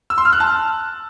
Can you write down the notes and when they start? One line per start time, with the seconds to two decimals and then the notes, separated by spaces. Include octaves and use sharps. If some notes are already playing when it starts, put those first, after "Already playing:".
0.10 E6
0.18 C6
0.25 F6
0.33 F#6
0.40 A5